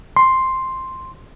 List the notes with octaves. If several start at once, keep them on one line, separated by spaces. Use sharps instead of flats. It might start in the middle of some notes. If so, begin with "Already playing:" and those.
C6